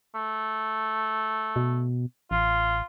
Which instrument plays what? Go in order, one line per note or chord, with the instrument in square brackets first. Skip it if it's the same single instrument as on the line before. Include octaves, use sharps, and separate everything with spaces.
[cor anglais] A3
[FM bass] B2
[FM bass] A1 [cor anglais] F4